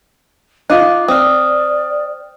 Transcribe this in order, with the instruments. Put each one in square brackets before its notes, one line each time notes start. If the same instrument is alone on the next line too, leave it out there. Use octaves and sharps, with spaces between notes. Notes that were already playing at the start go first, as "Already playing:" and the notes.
[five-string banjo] D#4 F4 [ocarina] F5 [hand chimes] D6 F#6
[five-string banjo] C4 [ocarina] D5 [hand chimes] D#6 F6